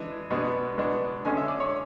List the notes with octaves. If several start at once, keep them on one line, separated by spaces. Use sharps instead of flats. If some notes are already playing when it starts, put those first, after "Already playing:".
Already playing: E3 G#3 D4
B2 G#3 B3 D4
B2 G#3 B3 D4
D3 G#3 C#4 G#5
E5
D5
C#5